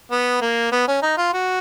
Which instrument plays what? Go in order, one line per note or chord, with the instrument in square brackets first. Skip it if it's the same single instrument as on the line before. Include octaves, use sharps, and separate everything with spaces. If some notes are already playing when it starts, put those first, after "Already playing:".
[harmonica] B3
A#3
B3
C#4
D#4
F4
F#4